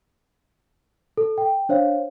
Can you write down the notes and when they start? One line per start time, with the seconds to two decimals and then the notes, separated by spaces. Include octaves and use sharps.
1.17 A4
1.38 G5
1.69 D4 C5 C#5 F5